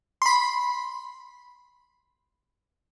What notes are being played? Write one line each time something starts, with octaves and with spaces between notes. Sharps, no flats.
B5 C6